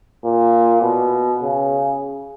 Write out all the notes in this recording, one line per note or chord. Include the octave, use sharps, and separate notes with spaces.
A#2
B2
C#3